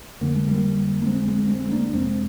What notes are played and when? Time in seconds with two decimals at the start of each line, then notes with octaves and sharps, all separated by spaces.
0.21 F2 D3 A#3
0.35 G#3
0.49 G3 A#3
1.02 A#3
1.07 G#3 C4
1.28 G#3 C4
1.50 G#3 C4
1.71 A#3 D4
1.93 F2 C3 G#3 C4